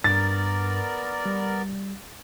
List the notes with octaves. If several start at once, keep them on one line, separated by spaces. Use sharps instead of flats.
G2 B3 A#4 D5 A6
G3